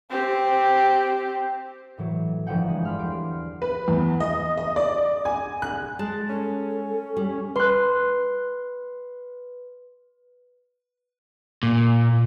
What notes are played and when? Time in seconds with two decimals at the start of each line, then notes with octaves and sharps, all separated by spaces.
0.10 C4 G4
1.98 A2 E3 F#3
2.47 G1 E3 F3 F#5 G5
2.68 G#3
2.84 D5 B5 C6 F6 F#6
2.99 E2 G4 C6 D7
3.62 B4
3.88 E2
4.20 D#5
4.57 D#5
4.76 D5
5.25 G#5
5.62 F#6
5.99 G#3 A5
6.29 C#4 A4
7.17 G3
7.56 B4 C6 F#6
11.63 A#2